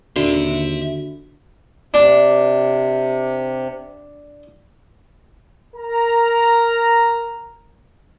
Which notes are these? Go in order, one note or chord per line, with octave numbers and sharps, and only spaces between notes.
D#2 D3 F#4 E5 C6
C3 D4
A#4 A#5